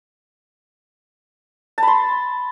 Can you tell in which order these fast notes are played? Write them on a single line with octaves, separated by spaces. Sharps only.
A5 B5 C6